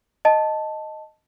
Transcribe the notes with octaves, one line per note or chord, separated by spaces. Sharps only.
D#5 A5